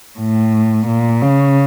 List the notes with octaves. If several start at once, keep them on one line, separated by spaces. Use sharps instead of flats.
A2
A#2
C#3